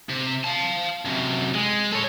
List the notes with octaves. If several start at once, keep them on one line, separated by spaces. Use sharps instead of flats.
C3
F5 A5
F#2 C3
G#3
A4 C#5